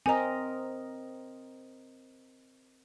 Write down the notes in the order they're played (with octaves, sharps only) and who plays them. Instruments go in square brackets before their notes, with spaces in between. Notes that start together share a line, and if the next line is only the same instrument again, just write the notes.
[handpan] C4 A#4 D#5 [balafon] G#5 A#5